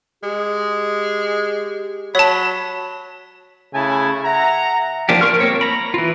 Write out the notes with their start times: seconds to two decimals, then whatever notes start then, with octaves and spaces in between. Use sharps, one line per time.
0.23 G#3 G4
2.15 F#3 C#5 A5 B5
3.74 C#3 A3 E4 G#5 A5
4.25 E5 F#5 A#5
5.09 F3 A#3 D4 G4
5.21 A#4 C6 C#6 F6
5.40 A#3 C4 C#5
5.61 A#5 B5
5.94 E3 F4